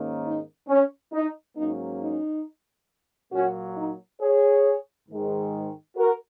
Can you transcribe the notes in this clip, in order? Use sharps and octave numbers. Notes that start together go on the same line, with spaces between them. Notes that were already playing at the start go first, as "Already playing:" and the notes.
Already playing: G#2 D#3 A#3 C#4
D#4
C#4
D#4
G#2 F#3 A#3 C#4 D#4
D#4
A#2 F#3 A#3 C#4 F#4
D#4
G#4 C#5
G#2 D#3 G#3
F#4 A#4